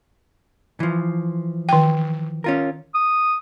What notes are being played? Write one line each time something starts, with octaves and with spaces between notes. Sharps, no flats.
E3 F3
D#3 G5
C#4 F4 A#4
D#6